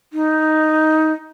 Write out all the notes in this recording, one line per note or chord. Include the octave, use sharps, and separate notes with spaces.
D#4